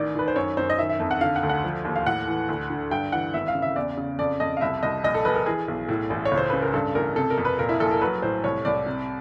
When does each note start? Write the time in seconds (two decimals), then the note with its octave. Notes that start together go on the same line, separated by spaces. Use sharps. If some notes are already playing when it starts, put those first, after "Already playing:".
Already playing: A1 D#3 D5
0.15 D#3 B4
0.28 C5
0.36 F#2 C#5
0.57 F#2 C5
0.70 D#5
0.79 D#3 E5
0.89 E5
1.00 F2
1.11 F#5
1.21 D3 F5
1.36 F#5
1.43 D2
1.49 F#5
1.64 F3
1.85 D#2
1.96 F5
2.06 A2 F#5
2.28 E3
2.49 D2
2.70 D3
2.91 G2 G5
3.12 E3 F#5
3.34 G#1 E5
3.48 F5
3.55 C#3
3.62 E5
3.76 E2 D5
3.98 C#3
4.19 F2 D5
4.40 F2 D#5
4.57 F5
4.61 C2 E5
4.83 C2 D#5
5.04 A#1 D#5
5.14 A4
5.25 A#1 B4
5.36 A#4
5.46 E3 G#4
5.68 B1
5.89 A2
6.10 A1
6.25 C#5
6.31 C#2
6.38 C5
6.50 C#3 B4
6.62 A#4
6.73 G2 A4
6.95 A1 A#4
7.16 C3 A4
7.30 A#4
7.38 F2
7.45 B4
7.59 A#2 A#4
7.69 E4
7.80 A#1 A4
7.91 A#4
8.01 F#3 B4
8.22 A2 C5
8.44 C2 C#5
8.65 C2 D5
8.86 C3